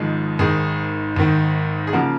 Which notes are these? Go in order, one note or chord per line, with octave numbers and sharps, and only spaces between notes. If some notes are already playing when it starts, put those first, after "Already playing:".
Already playing: G#1 G#2 F3 G#3
G#1 G#2 D#3 G#4
G#1 G#2 D#3
G#4
C#3 F3 A#3 F#4